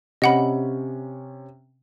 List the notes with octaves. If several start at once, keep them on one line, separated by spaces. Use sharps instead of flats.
C3 C#4 D#5 F#5 B5